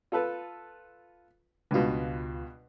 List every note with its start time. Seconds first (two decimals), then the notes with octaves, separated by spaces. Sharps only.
0.12 F4 A4 B4
1.71 C#2 G2 B2 F4